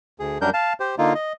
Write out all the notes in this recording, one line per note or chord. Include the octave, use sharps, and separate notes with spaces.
D2 G#4
F#2 G3 D4 A#4 G6
F5 A5
G4 C5
D3 A#3 D#4 F4
D#5